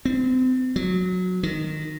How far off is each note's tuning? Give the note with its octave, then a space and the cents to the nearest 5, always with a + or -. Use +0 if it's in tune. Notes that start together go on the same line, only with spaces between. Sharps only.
C4 -35
F#3 -15
D#3 -10